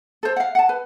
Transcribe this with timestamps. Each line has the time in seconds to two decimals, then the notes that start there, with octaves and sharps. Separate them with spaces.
0.23 A4 C5
0.36 F5 F#5
0.55 F#5 A5
0.69 B4